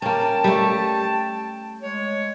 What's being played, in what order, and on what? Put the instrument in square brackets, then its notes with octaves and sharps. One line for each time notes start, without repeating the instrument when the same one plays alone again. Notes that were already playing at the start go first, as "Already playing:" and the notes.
[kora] A#3 C#4 [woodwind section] G5 A5
[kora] G3 A3
[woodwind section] G#3 C#5